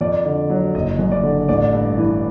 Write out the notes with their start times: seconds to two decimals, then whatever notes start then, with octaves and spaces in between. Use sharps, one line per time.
0.01 F2 D5
0.26 D3
0.50 F#3
0.75 F#1 D#5
0.99 F#2
1.12 D5
1.23 D3
1.49 A1 D5
1.73 G2
1.98 E3